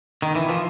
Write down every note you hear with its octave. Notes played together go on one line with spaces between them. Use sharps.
D#3
E3
F3